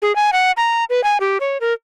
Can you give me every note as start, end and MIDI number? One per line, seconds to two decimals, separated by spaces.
0.02 0.15 68
0.16 0.31 80
0.33 0.51 78
0.57 0.84 82
0.90 1.04 71
1.04 1.18 80
1.20 1.38 67
1.40 1.58 73
1.61 1.73 70